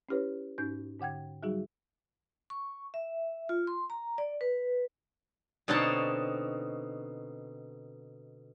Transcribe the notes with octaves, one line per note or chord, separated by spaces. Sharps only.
C#4 E4 G4 B4 C#5
G#2 C#4 D#4 G6
G#2 D3 F#5 G5 G#6
F#3 G3 D#4 F#4 G#4
C#6
E5
F4
C6
A#5
D5
B4
B2 D3 C4 D#4 C#5 A5